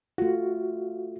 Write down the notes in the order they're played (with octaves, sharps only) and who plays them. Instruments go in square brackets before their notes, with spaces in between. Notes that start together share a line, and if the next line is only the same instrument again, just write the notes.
[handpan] A3 F4 [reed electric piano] F#4